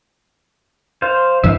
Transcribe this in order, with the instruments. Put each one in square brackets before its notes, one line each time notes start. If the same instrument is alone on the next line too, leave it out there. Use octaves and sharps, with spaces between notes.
[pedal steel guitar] C5 F5
[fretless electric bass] C2 G2 E3 [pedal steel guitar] E5 F5